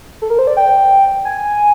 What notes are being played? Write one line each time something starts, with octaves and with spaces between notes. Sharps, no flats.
A4
A#4
C5
D5
G5
G#5